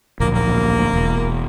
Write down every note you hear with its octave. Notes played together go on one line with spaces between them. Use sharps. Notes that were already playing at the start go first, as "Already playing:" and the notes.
D1 A#1 A#3
A#3
E1